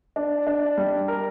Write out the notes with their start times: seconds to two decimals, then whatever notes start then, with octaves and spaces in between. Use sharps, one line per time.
0.16 D4
0.47 D4
0.77 G3
1.08 A#4